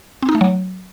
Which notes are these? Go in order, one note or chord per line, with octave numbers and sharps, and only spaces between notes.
C4
D#4
A3
F#3